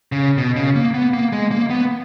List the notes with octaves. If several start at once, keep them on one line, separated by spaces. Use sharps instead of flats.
C#3
B2
C#3
A#3
B3
A#3
G#3
A#3
B3